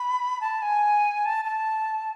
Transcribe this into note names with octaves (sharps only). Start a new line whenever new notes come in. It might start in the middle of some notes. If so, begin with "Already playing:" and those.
Already playing: B5
A5
G#5
A5
A5